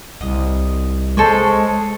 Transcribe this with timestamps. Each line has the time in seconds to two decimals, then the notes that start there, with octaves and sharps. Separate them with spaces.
0.21 C2 D#5
1.17 G#3 A4 C5 C#5